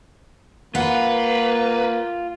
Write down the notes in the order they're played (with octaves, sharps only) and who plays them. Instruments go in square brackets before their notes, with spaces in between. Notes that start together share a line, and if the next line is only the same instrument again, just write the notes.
[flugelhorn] A#3 [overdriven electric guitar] F4 [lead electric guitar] B4 [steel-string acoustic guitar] F#5